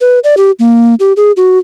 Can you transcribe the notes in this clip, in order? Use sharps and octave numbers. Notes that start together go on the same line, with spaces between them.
B4
D5
G4
A#3
G4
G#4
F#4